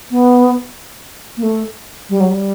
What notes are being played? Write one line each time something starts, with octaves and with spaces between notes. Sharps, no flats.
B3
A#3
A3
G3
F#3
G3